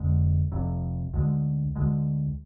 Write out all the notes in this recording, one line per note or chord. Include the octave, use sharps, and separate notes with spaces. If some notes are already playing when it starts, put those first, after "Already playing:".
Already playing: F1 F2 D3 G#3
F1 F2 C3
D2 D3 G#3
D2 D3 G#3